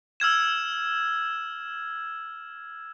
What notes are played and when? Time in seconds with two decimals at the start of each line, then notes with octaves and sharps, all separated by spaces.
0.20 E6 F6 G#6 E7